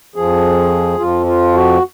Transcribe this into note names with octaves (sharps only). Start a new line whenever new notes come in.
F2 F3 G#4
F2 F3 F4
F4
F#4